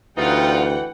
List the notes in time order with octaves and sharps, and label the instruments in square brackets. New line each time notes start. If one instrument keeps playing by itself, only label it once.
[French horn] D2 [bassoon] E3 [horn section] G3 D#4 F4 [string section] F#5 G5